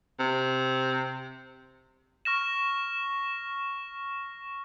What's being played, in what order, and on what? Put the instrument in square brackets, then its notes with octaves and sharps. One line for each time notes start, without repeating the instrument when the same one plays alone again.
[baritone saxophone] C3
[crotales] C#6 F6 A#6 E7